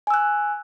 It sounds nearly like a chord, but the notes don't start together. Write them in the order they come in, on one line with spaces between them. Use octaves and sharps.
G#5 E6 F#6